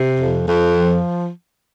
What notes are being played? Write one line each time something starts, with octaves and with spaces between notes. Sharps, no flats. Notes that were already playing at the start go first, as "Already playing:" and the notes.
Already playing: C3
F2
F2
F3